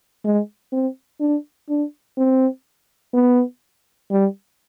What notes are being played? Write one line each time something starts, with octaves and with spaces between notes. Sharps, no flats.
G#3
C4
D4
D4
C4
B3
G3